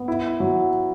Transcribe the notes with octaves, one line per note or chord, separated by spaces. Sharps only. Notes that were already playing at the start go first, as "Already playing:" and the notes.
Already playing: B3
E4
F#3